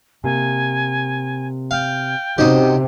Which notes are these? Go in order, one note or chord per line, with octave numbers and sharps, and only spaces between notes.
C3 A#3 G#5
F5 G5
C3 C#4 D#4 F#4 G4 C5 D#5